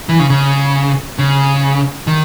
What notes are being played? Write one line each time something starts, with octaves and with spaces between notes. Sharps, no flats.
E3
C#3
C#3
C#3
D#3